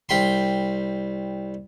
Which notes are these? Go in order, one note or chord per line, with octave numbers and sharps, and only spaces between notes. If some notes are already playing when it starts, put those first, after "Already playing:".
C2 G5 B5 C6